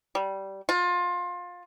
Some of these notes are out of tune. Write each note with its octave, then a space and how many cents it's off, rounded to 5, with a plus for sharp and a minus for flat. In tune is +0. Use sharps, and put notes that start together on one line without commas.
G3 -15
F4 +25